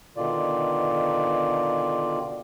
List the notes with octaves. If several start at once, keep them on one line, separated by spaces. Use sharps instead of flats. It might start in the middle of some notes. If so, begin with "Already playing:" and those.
B2 D3 D#3 F4 D5